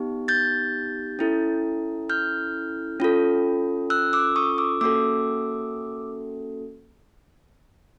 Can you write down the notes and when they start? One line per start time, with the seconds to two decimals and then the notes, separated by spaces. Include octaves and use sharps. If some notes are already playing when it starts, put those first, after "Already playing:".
Already playing: B3 D#4 G4
0.28 G6 A6
1.19 C#4 E4 A4
2.10 F6 G6
3.00 C#4 F4 A4
3.90 E6 F#6
4.13 D6 E6
4.36 C#6 D#6
4.58 D6 E6
4.81 A#3 C#4 F#4 A4 D6 E6